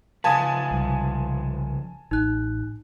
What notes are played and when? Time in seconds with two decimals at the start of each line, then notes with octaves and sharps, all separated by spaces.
0.24 C#3 F3 B4 F5 G#5 A5 D#6
0.71 C2
2.11 A1 D#4 F#6